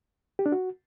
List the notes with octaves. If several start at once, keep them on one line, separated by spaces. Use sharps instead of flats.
G4
D4
F#4